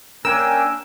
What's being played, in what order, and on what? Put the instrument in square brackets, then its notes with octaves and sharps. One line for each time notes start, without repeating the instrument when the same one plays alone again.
[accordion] A#3 C#4 D4 [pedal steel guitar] A#4 G5 G#5 [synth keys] E6